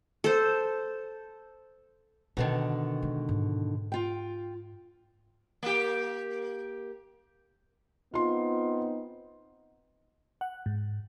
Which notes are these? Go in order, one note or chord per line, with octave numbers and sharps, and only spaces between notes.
A4 C5
B2 D3 D#3 D4
G#3
G#2
F4 G5
A#3 G4
B3 C4 D#4 F4 C6
F#5
G#2